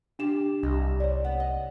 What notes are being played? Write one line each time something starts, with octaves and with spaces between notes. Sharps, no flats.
C3 D4 F4 G4 E7
C2 D#4
G3 C4 C#5 D5
B3 F#5
D#5